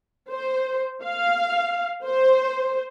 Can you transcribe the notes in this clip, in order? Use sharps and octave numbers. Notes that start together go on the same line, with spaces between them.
C5
F5
C5